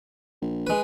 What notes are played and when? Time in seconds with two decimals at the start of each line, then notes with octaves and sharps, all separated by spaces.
0.41 A#1
0.67 G#3 B4